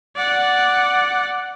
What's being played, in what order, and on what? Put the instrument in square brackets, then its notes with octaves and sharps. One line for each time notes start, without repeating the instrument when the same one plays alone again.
[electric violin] D5 F#5